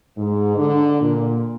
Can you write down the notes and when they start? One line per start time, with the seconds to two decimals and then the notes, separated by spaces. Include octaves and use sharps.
0.17 G#2
0.56 D3
1.00 A#2